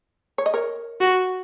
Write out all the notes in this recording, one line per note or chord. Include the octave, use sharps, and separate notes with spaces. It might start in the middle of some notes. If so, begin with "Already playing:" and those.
C#5
D#5
A#4 C#5
F#4